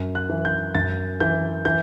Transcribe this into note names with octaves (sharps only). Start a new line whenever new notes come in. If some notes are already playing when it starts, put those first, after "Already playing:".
Already playing: F#2
F#6
E3
G6
F#2 A6
E3 G6
E3 G6